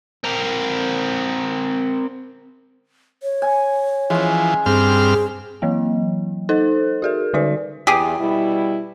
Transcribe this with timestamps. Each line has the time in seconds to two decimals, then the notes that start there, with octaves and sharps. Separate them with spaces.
0.24 C4 A#4
3.23 C#5
3.42 G#5
4.10 E3 F3 G#3 C#4
4.66 G2 C4 G#4 F6
5.62 E3 F#3 A#3
6.49 D#4 A4 C5
7.02 F#4 G#4 A#4
7.34 D3 G3 D#4 F#4 D5
7.87 E2 G4 G#4
8.18 B2 G3 E4